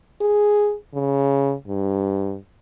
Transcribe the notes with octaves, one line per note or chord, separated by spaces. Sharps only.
G#4
C#3
G2